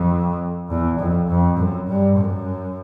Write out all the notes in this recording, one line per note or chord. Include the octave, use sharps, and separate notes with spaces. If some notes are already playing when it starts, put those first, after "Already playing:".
Already playing: F2
E2
F2
F2
F#2
G2
F#2